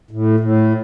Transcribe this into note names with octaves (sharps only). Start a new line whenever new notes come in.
A2
A2